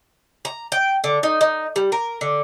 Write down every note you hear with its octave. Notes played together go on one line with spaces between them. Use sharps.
A#5
G5
D3
D#4
D#4
G3
A#4
D3